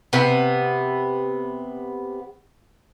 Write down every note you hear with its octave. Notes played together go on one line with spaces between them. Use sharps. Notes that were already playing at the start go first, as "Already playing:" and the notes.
C3 B3